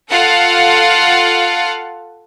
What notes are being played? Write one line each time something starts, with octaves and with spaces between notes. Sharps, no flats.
F4 A4 F5 F#5